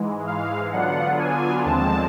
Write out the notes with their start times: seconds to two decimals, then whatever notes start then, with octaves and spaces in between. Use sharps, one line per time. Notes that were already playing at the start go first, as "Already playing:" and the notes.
Already playing: G#2 E3 G#3
0.27 F5
0.72 D3 F#3 B3 D4 F4 F#5
1.19 G#5
1.65 D#2 D3 F3 G#3 C4 A5